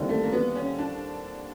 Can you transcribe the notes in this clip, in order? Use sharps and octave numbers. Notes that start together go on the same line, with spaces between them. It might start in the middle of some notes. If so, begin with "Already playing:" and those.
Already playing: D#2 D3 G3 C4 E4
A3
A#3
B3
C#4
D4